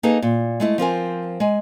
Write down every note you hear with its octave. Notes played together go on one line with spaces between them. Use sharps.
A#3 D#4 G#4 A4 B4 D#5
A#2
G#3 A3 E4
F3 C4 A#4 G#5
G#3 G#5